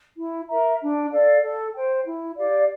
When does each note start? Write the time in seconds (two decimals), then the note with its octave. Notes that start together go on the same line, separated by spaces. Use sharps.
0.17 E4
0.48 A#4 E5 A#5
0.81 D4
1.11 A4 D5 F5
1.42 A4
1.74 C5 G5
2.05 E4
2.37 G4 D5 F5